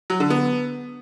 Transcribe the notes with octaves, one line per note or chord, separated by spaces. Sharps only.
F#3
D3
B3